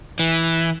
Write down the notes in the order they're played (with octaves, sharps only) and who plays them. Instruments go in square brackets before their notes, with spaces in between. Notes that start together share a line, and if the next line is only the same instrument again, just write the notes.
[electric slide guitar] E3